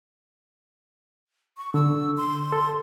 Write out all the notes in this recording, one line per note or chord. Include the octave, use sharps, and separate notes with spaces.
C#6
D3 E6
C6
A4